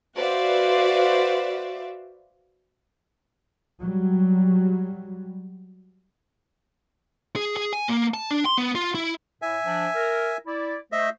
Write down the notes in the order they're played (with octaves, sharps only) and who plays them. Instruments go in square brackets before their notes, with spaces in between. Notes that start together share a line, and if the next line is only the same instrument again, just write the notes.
[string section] F#4 B4 C5 D5 E5 F5
[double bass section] F#3 G3
[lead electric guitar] G#4
G#4
G#5
A#3
A5
D4
C6
B3
F4
E4
[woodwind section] A2 [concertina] E5 G#5
[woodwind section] F3 D4
A#4
E4 D5
[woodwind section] A3 C5 [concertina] D#5 E5